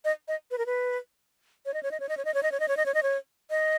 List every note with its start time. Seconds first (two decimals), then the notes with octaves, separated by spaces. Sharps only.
0.05 D#5
0.28 D#5
0.51 B4
0.58 A#4
0.66 B4
1.66 C#5
1.74 D#5
1.83 C#5
1.91 D#5
2.00 C#5
2.09 D#5
2.17 C#5
2.25 D#5
2.34 C#5
2.43 D#5
2.52 C#5
2.60 D#5
2.68 C#5
2.77 D#5
2.86 C#5
2.94 D#5
3.03 C#5
3.50 D#5